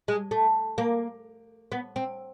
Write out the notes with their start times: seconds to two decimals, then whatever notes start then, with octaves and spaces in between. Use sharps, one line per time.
0.08 G#3
0.31 A3
0.78 A#3
1.72 B3
1.96 C4